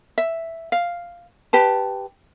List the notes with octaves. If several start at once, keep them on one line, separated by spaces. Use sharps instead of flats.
E5
F5
G4 B4 A5